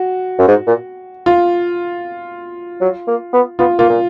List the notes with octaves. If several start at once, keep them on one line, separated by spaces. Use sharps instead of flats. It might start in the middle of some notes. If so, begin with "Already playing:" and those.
Already playing: F#4
F#2
G#2
A#2
F4
F#3
A#3
B3
B3 F4
A#3 F4
A#2